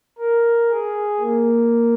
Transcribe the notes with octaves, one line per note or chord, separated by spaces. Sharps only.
A#4
G#4
A#3